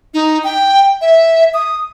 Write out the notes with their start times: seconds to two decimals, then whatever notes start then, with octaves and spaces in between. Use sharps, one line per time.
0.14 D#4
0.44 G5
1.01 E5
1.54 D#6